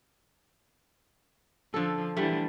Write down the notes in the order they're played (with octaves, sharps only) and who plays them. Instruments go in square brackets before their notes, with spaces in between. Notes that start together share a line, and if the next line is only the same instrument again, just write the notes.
[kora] D3 A4 [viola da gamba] F3
[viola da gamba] D3 E3 [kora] G3 A3